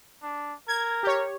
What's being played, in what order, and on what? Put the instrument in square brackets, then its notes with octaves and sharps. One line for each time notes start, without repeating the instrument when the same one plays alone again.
[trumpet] D4
[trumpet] A#4 [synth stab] G#6
[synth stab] G4 C#5